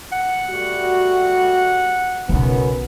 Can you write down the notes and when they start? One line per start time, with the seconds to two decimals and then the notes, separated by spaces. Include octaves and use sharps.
0.12 F#5
0.50 G3 A3 F#4
2.29 B1 F#2 C#3 B3